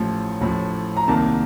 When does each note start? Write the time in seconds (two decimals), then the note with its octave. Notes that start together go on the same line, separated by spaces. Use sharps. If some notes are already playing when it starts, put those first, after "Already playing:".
Already playing: A1 A2 F3
0.41 A1 A2 F3
0.97 A#5
1.08 C2 C3 D#3 A#3 A5